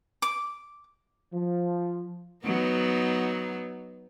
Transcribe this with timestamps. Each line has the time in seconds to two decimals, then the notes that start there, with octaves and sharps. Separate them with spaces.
0.22 D6
1.33 F3
2.45 F#3 B3 D#4